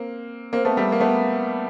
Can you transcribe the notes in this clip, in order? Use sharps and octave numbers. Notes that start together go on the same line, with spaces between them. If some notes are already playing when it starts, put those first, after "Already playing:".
Already playing: A#3 C4
A#3 C4
A3 B3
G3 A3
A#3
A3 B3